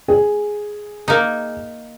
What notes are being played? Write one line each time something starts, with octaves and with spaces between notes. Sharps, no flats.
G#4
A#3 D#4